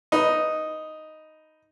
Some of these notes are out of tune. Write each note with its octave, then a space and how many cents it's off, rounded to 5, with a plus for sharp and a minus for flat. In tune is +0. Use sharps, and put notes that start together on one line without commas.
D#4 +0 B4 +0